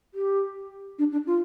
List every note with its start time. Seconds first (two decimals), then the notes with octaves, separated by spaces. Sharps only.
0.14 G4
0.99 D4
1.12 D4
1.27 F4